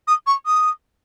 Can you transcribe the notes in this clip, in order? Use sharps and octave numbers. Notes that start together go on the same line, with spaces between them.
D#6
C#6
D#6